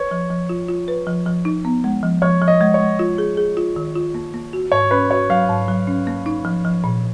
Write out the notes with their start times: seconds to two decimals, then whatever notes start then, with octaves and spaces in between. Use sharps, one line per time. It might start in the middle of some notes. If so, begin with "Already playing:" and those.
Already playing: B4 C#5
0.11 F3
0.30 F3
0.49 F4
0.69 F4
0.88 B4
1.07 F3
1.26 F3
1.45 D#4
1.65 B3
1.84 G#3
2.03 F3
2.22 F3 C#5
2.42 F3
2.48 D#5
2.61 G#3
2.74 C#5
2.80 G#3
2.99 F4
3.18 G#4
3.37 G#4
3.57 F4
3.76 D#3
3.96 F4
4.14 A#3
4.34 A#3
4.53 F#4
4.72 G#2 C#5
4.91 C#4 B4
5.11 F#4 C#5
5.30 F#3 F5
5.49 G#2
5.68 F#3
5.87 C#4
6.07 A#3
6.26 D#4
6.45 F3
6.65 F3
6.84 A#2